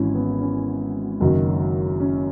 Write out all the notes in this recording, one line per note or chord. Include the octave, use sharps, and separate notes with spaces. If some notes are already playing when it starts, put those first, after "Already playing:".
Already playing: G#1 G#2 E3 C#4 E4
B3
C#4
F#1 F#2 D#3 F#3
C#4